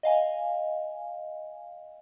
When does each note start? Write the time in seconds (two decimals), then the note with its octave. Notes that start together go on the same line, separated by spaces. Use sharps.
0.03 D#5 F5 G#5